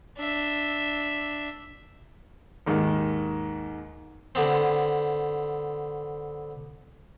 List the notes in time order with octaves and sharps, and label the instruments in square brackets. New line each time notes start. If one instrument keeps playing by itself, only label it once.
[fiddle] D4 E5
[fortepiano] D#2 G#2 D#3
[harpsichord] D3 B3 C4